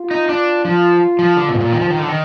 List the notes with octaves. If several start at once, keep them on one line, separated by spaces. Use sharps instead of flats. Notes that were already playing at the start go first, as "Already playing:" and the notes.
Already playing: F4
D#4
D4
F3 F4
F3
D3 F4
B2
G#2
A#2
D#3
F3
D#3
D3
D#3